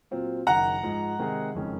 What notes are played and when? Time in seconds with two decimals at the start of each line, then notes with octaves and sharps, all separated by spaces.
0.11 A#2 F#3 C4 F4
0.46 F#1 F#2 D#3 F#5 A#5
0.83 G#2 F3 G#3
1.19 C3 D#3 G#3 D#4 G#4
1.55 F#1 F2 D#3 G#3 C#4